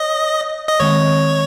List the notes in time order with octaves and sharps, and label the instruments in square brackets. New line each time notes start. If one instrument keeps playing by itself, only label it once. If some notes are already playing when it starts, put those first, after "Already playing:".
Already playing: [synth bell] C#5 [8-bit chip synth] D#5
[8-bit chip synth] D#5
[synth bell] D#3 G#3 C4 [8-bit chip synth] C#5